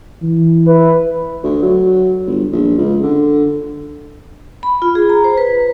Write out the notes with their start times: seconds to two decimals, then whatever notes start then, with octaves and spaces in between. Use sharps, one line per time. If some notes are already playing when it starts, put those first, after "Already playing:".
0.22 E3
0.66 E4 B4
1.43 D2
1.62 F#3
2.27 G1
2.52 A#1
2.77 C#2
3.02 D3
4.63 B5
4.82 F4
4.95 G#4
5.09 A#5
5.24 C5
5.38 B4